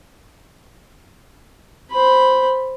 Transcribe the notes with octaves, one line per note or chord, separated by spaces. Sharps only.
C5 B5